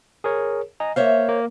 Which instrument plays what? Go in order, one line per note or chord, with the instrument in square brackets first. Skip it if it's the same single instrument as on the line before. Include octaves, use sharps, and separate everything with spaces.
[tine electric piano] G#4 A#4 C#5
D#5 G#5 A#5
[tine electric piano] A#3 F5 [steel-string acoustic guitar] C5 C#5 E5
[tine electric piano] A#3